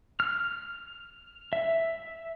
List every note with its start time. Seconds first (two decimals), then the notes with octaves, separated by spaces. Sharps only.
0.20 F6
1.53 E5